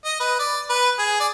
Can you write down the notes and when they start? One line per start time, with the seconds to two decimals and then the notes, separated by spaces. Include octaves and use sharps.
0.05 D#5
0.20 B4
0.39 D5
0.70 B4
0.99 G#4
1.20 D5